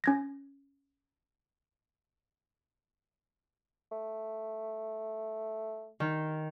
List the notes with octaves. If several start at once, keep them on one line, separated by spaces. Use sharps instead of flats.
C#4 G#6 A#6
A3
D#3